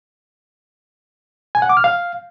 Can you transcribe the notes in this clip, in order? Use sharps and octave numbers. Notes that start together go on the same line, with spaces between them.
G#5
F#5
D6
F6
F5